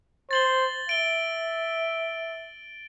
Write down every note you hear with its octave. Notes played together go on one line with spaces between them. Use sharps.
C5 A6 F#7 G7
E5 D7 G7